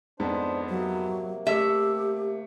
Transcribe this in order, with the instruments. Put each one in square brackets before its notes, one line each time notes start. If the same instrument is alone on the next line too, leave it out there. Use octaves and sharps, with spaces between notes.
[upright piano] F2 G#2 B3 [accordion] D4 C5
[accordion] C3 A#3 [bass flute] F#3
[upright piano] A3 [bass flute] G4 [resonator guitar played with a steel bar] E5